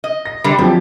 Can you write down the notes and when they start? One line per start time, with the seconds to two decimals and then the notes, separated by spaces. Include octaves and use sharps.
0.04 D#5
0.25 A#6
0.44 D3 G3
0.58 F2 F3 F#3 G4